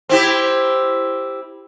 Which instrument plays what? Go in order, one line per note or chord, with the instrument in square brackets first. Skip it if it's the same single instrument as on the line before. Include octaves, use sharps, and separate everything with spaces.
[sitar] C4 E4 G4